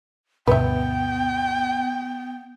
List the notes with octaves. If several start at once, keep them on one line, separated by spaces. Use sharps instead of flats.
D2 G2 B2 B3 B4 E5 G5